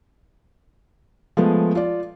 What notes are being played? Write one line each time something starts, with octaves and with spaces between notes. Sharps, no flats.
F3 G#3 A3 B3
F4 D5